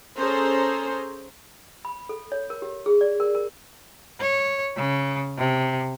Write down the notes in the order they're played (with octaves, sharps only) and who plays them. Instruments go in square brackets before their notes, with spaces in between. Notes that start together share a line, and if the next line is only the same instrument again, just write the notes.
[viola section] C#4 G#4 A4 C5 A#5
[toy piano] B5
A4
C#5
A#4
G4
G#4
D5
A#4
A#4
[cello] C#5
C#3
C3